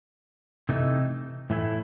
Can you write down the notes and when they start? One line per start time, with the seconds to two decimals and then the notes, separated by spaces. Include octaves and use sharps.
0.69 C3 E3 A3 D#4
1.50 A2 E3 A3 E4